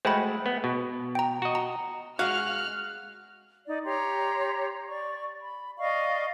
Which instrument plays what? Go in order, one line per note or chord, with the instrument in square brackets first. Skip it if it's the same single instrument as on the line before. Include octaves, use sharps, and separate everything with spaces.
[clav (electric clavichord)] G#3 A3 F#4 [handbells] C5 G5 B5
[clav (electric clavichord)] B3
B2
[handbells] G5 A#5
[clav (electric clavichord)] F#4 D#5
[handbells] A#5
[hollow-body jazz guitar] G#3 F#4 [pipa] F5 [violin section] F6 [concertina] F#6
[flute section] D#4 D5
G4 C#5 A#5 C6
D5 C#6
B5
D5 D#5 F5 C#6